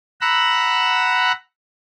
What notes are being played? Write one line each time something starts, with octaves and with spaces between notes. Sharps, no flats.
F#5 A#5 B5 E6 F#6